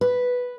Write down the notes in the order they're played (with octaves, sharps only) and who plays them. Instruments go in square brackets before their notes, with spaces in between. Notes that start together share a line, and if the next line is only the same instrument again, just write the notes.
[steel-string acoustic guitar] B4